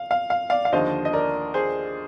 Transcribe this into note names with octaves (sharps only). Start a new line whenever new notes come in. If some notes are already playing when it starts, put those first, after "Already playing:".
Already playing: F5
F5
F5
D5 F5
F5
D#2 D3 F3 C5 D#5
D#5
A#4 D5
G#4 C5